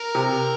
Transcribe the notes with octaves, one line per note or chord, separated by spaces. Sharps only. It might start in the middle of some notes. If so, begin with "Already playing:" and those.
Already playing: A#4
C3